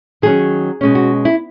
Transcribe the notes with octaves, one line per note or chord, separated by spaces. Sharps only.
D#3 F#3 C#4 G#4
B2 G#3 C#4
F#4
E4